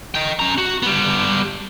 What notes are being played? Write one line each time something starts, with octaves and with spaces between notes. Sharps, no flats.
D#5 G5
C#4 A#5
F#4
G3 B3